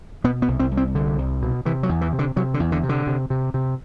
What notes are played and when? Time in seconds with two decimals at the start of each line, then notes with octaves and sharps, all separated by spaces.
0.24 B2 B3
0.42 B3
0.48 C2
0.60 C4
0.71 C2
0.77 C4
0.95 C2 D3
1.18 C2
1.42 B2
1.65 C3 E3
1.83 F#3
1.89 E2
2.01 E3
2.13 C3
2.19 D3
2.36 C3 F#3
2.54 D3
2.60 E2
2.72 D3
2.83 C3
2.89 D3
3.07 C3
3.30 C3
3.54 C3